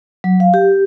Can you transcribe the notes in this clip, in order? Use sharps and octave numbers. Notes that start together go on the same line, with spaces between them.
F#3
F5
G4